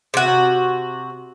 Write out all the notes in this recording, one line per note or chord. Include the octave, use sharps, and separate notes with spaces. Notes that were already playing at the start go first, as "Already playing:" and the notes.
C3 F#4